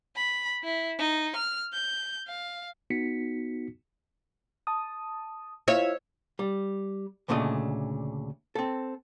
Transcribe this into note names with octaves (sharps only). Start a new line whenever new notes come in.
B5
E4
D#4
F6
G6
F5
B3 D#4 F#4 B6 C#7
A5 D#6
E4 F4 C#5 E5 F5
G3
D2 A#2 C#3 A3 D4 D#5
C4 A4